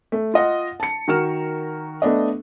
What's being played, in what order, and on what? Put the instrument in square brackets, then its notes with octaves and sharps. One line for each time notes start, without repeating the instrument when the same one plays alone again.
[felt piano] A3
F4 D#5 F#5
A5 C#7
D#3 F#4 A#4 F6 E7
A3 B3 D4 D#5